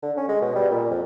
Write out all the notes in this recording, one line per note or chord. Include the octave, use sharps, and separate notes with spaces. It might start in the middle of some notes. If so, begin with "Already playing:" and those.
D3
C#4
G#3
B2
G3
A#2
F2